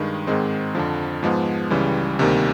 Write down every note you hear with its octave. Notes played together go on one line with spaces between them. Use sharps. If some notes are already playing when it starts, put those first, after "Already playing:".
Already playing: G2 D#3 G#3
G#2 D#3 G#3 C4
F2 D3 F3
G#2 F3 G#3 B3
C#2 C#3 E3 G3
D2 C3 D#3 G3 A#3